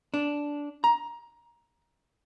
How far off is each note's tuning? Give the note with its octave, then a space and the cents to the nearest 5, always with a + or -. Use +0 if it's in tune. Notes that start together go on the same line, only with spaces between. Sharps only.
D4 -10
A#5 +15